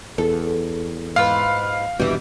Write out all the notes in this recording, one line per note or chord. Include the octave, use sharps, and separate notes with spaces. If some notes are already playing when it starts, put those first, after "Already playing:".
E2 A4
G#2 E4 F4 B4 F5
D#1 G2 B2 E3 G3